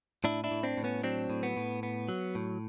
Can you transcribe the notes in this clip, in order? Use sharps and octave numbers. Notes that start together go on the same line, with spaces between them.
A2 D4 E4
D4 E4
A2
C4 D4
A2
B3 C#4
F#3 C4 D4
A2
B3
A2
B3
F#3
A2